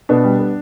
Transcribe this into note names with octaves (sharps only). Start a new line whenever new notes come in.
B2 B3 D4
G3
B3